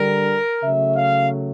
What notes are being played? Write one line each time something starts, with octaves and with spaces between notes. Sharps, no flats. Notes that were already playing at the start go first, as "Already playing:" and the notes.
Already playing: D3 G3 A#4
C#3 F#3 A3 E5
F5